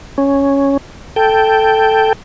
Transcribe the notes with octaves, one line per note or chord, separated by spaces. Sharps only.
C#4
A4 G5